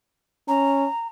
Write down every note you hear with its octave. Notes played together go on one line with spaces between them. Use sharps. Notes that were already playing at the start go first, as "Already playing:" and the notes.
C#4 A#5